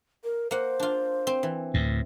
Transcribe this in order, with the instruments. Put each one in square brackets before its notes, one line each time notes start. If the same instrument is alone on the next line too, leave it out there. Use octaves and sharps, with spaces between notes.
[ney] A#4
[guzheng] A#3 F#5 [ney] C5
[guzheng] D4 F4
C4
E3
[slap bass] D2 A2